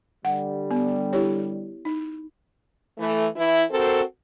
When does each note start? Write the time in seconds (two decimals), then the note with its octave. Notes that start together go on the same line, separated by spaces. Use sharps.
0.25 D3 G3 F#5
0.71 B3
1.13 E4 G4 C#5
1.85 D#4
2.99 E3 A3
3.36 E3 E4
3.71 C4 F#4 A4 A#4 C5